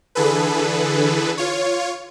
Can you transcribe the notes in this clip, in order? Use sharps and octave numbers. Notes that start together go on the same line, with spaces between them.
D3 E3 G#4 A4 B4
F4 C#5